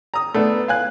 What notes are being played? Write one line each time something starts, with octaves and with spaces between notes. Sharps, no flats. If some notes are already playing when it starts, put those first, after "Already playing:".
A#5 D#6
A3 B3 D4
F5 G#5 F#6